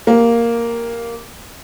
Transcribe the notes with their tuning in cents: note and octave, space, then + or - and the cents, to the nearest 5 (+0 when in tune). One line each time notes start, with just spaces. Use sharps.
A#3 +0 G4 +10